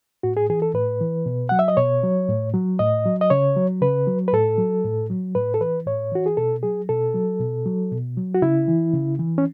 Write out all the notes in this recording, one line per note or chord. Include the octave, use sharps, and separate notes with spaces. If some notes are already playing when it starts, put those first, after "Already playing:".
A2 F#4
G#4
E3 G#4
A4
A2 B4
E3
B2
F#3 F#5
E5
D#5
B2 C#5
F#3
A2
F#3
A2 D#5
F#3
D#5
C#3 C#5
F#3
C#3 B4
F#3
B4
A2 A4
F#3
A2
F#3
A2 B4
A4
E3 B4
A2 C#5
E3 F#4
G#4
B2 A4
F#3 G#4
B2 A4
F#3
B2
F#3
B2
F#3
F#4
C#3 E4
E3
C#3
E3
C#4